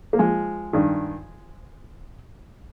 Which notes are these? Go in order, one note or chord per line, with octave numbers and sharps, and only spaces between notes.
A#3
F3 G#3
G2 D#3